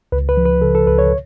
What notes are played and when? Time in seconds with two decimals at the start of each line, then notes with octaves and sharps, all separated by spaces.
0.12 C#2 B4
0.29 B4
0.37 F3
0.45 B4
0.62 C#3 A4
0.75 A4
0.87 C#2 B4
0.98 C#5